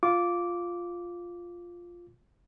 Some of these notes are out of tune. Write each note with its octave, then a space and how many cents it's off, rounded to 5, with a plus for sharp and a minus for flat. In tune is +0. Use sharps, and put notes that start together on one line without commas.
F4 +0 D6 -10